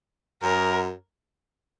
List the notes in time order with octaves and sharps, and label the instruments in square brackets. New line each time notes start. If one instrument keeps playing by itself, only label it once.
[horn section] F#2 [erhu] A#4